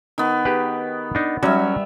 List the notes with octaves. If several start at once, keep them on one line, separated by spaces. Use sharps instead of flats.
D#3 B3
G4 G#4 B4
D4 D#4
F#3 G3 C#4 F#4 E5